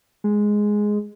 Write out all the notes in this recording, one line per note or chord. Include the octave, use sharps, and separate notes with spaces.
G#3